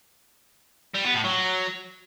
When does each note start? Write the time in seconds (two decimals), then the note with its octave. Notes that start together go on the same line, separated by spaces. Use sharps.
0.94 G3
1.04 B3
1.14 A2
1.24 F#3